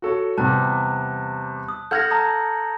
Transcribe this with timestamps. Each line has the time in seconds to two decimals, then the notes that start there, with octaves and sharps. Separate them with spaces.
0.02 F#4 A4 C#5
0.38 E2 C3 G3 A5 F#6
1.69 D#6
1.91 A4 F#5 F6 G6 G#6 A#6
2.11 A5 A#5 D#6